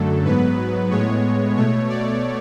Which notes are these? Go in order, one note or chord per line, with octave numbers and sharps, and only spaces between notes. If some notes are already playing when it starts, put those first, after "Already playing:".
Already playing: F#2 D3 F#3 A3 A4
G#2 F#3 B3 B4
A2 G#3 B3 C#5
B2 A3 C#5
D5